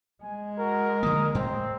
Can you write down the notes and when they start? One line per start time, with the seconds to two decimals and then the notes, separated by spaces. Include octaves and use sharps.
0.23 G#3 G#5
0.59 F#4 A#4
1.03 D3 F3 A#3 D#6
1.35 A2 C4